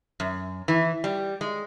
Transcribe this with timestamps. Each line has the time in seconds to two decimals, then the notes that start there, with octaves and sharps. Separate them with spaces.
0.20 F#2
0.68 E3
1.04 G3
1.41 G#3